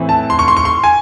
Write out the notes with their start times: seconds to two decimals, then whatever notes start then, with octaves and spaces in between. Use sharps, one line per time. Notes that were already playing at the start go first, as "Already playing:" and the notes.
Already playing: A2 E3 C4
0.09 A5
0.30 C6
0.39 C#6
0.48 C6
0.57 C#6
0.65 C6
0.84 G#5